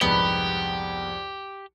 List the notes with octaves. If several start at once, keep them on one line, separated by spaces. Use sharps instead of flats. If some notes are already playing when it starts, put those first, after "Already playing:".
C2 F2 G#2 B3 G4